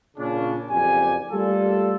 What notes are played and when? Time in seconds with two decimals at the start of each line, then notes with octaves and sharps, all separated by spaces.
0.17 A#2 C#3 C#4 D4
0.70 F#1 F2 G4 D5 G#5
1.30 G3 A3 A#3 F4 A4